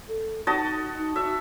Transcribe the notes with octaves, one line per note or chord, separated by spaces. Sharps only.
A4
D#4 F#4 D#5 A5
D#4
F#4 E5